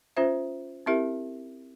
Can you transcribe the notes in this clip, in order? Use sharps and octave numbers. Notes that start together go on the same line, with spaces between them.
C#4 F4 C5 E5
C4 E4 G4 A#4 E5